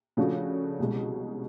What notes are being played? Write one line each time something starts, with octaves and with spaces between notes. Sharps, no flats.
C#3 F3 A3 D4 F#4
C2 B2 G#3